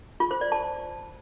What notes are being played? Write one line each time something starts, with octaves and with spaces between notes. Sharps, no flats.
F4
C5
D5
A5